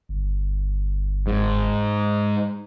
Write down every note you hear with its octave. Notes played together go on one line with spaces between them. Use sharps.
G1
G#2